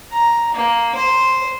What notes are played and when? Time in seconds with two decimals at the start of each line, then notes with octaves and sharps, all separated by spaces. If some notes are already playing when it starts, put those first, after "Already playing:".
0.12 A#5
0.54 A#3
0.95 C5